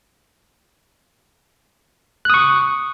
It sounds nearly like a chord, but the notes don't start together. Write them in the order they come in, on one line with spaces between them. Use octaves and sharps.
F#6 D#6 C#6